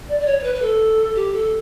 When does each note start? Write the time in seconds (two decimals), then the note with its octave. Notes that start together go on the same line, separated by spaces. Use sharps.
0.09 D5
0.20 D5
0.26 C#5
0.39 C#5
0.44 B4
0.55 B4
0.62 A4
1.15 G4
1.33 A4